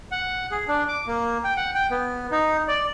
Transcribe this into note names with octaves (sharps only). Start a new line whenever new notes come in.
F#5
G#4
D4
D6
A#3
G5
F#5
G5
B3
D#4
D5